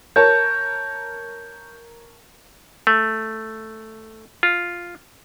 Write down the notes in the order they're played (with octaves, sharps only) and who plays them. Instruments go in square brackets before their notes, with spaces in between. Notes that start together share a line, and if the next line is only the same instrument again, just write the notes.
[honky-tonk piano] A#4 C#5 A5 [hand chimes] G6
[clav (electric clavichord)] A3
F4